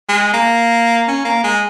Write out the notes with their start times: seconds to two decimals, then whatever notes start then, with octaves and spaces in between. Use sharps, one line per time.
0.09 G#3
0.33 A#3
1.07 C#4
1.25 A#3
1.44 G#3